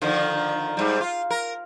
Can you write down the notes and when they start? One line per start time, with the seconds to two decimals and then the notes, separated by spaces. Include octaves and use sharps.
0.02 D3 D#3 F3
0.77 G#2 G3
1.01 F4
1.30 A#4